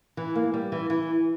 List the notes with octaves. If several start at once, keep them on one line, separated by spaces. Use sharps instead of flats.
E3
A#3
G3
E3
E3